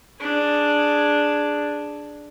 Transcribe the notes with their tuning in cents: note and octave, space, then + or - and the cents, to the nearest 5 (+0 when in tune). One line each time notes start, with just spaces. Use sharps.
D4 +0 G#4 +0